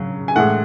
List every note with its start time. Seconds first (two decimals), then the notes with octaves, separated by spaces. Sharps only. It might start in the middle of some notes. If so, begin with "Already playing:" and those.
Already playing: C#3 F#3
0.28 G#5
0.36 A2 E3 G#3 F#5